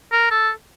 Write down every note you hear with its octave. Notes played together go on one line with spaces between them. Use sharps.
A#4
A4